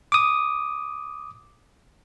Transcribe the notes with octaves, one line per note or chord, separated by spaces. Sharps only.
D6 D#6